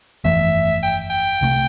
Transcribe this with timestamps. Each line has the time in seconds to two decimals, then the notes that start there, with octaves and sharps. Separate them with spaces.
0.24 G1 F2 E3 A3 E5
0.83 G5
1.10 G5
1.41 C2 C3 F3 A3